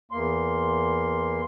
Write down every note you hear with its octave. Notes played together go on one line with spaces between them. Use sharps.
E2 A#3 C6